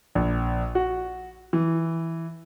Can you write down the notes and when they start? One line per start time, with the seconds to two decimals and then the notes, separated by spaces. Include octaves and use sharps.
0.15 A#1
0.75 F#4
1.53 E3